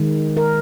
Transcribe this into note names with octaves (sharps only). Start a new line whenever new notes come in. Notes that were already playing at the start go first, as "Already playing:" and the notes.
Already playing: D#3 G#3
A#4